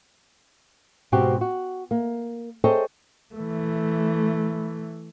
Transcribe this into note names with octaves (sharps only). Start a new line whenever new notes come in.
G#2 B2 C4 F#4 G4
F#4
A#3
G#4 A4 C5 C#5 D#5 G5
E3 A3